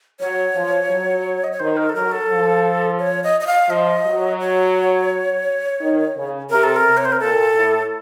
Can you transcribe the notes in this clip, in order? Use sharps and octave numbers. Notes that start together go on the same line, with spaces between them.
F#3 C#5
F3
F#3
D#5
C#5
D#3 C5
A#4
A4
F#3 A#4
A4
F3
C#5
D#5
D#5
F5
F3 D#5
F#3
C#5
D#3
C#3
C3 A#4
A4
A#4
C3
C#5
C5
A#4
A#2 A4
A2